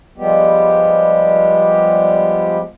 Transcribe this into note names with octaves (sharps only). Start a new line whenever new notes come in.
F3 G3 G#3 B3 G4